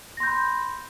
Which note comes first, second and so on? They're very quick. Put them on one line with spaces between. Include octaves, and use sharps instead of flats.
A#6 C6 G6 B5